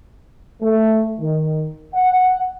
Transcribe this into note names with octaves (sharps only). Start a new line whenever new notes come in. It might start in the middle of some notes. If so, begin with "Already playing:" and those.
A3
D#3
F#5